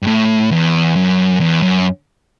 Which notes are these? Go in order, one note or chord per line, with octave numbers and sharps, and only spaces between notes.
G2
A2
E2
F#2
E2
F#2